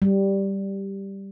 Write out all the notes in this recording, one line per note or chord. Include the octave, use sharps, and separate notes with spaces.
G3